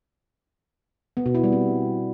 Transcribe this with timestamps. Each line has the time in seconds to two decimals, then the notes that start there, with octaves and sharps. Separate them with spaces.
1.17 B3
1.26 B2
1.35 E4
1.44 G3
1.52 C4